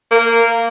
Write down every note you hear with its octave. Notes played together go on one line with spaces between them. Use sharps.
A#3